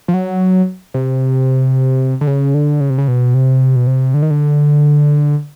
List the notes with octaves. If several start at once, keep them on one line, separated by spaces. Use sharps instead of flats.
F3
F#3
C3
D3
C#3
D3
C#3
C3
C#3
B2
C3
B2
C3
D3
D#3
D3